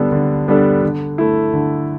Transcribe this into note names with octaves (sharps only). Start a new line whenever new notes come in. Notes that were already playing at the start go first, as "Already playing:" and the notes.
Already playing: D3 G3 B3 D4 A4
D3
G3 B3 D4 A4
D3
A3 E4
D3